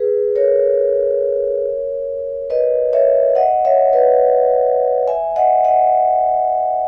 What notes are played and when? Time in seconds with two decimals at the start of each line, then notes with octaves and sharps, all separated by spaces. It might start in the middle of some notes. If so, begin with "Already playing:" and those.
Already playing: G#4 B4
0.35 A#4 C#5
2.50 B4 D#5
2.93 C#5 E5
3.35 D#5 F#5
3.65 C#5 E5
3.93 B4 D#5
5.08 E5 G#5
5.36 D#5 F#5
5.64 D#5 F#5